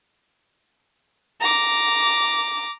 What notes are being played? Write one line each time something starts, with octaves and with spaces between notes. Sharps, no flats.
A#5 D6